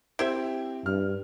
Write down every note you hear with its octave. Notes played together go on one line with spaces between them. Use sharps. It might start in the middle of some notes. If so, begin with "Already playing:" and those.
C4 E4 G4 C5 E5
G2 F6